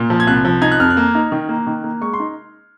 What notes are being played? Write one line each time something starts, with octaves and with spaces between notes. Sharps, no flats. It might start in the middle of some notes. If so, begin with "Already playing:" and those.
Already playing: A#2
F3
G#6
C2 F#6
F3
D#4 G#6
F#6
F2 F6
F#6
A#3
D#4
D#3
A#3
D#3
A#3
G#3 C#6
C6
D#4